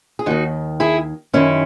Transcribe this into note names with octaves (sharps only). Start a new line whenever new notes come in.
G#4
D#2 D#3 D#4 F#4
E4 G#4
F#2 D#3 C#4 E4